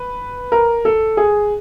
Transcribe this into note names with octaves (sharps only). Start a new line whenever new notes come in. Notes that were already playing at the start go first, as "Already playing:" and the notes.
Already playing: B4
A#4
A4
G#4